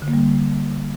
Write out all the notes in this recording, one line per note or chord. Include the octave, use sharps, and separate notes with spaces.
D3
A#3
G3
D3